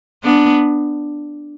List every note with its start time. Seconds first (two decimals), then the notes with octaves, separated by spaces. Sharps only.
0.24 B3 D4